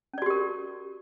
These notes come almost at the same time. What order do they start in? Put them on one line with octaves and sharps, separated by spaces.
C#4 D5 F#4 G4 A#4